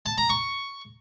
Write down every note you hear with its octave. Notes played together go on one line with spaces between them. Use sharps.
A5
A#5
C#6